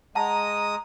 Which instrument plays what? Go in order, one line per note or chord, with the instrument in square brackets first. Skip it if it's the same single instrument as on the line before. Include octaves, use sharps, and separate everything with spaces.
[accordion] G#3 [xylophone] F#5 A5 [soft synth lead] A#5 [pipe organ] D#6